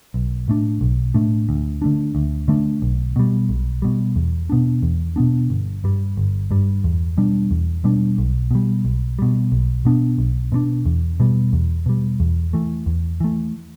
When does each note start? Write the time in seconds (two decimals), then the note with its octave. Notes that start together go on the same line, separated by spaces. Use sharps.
0.14 B1
0.48 A2 A3 D4
0.81 B1
1.14 A2 A3 D4
1.49 D2
1.82 D3 A3 D4
2.15 D2
2.48 D3 A3 D4
2.82 B1
3.16 B2 G3
3.49 B1
3.82 B2 G3
4.16 E2
4.50 B2 B3 D4
4.83 E2
5.16 B2 B3 D4
5.50 G1
5.84 G2 G3
6.17 G1
6.51 G2 G3
6.84 E2
7.17 B2 G3 D4
7.51 E2
7.84 B2 G3 D4
8.18 B1
8.51 B2 G3
8.85 B1
9.19 B2 G3
9.52 B1
9.85 B2 B3 D4
10.18 B1
10.52 B2 B3 D4
10.86 E2
11.20 B2 G3
11.53 E2
11.86 B2 G3
12.20 E2
12.53 E3 A3
12.86 E2
13.20 E3 A3